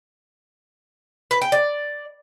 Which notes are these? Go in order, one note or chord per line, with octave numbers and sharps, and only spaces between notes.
B4
G5
D5